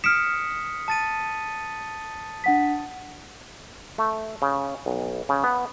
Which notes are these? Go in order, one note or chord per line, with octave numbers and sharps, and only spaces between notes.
D#6 F6 B6 C#7 D7 E7
A5 A6 D#7
D4 F#5 B6
A3
C#3
B1
C#3
B3